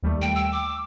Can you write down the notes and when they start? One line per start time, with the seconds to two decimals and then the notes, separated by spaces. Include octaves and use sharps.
0.02 D#2 G3 A3
0.22 G5
0.36 G5 E6
0.52 D6